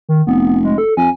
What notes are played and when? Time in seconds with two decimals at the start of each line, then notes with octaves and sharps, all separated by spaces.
0.09 D#3
0.27 F1 B3
0.64 G#3
0.78 A4
0.97 F2 G#5